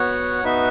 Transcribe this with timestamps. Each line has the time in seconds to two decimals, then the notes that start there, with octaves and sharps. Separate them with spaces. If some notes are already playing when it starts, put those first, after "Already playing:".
Already playing: B3 F#4 C#5 F#5
0.44 B3 D#4 F#4 B4 E5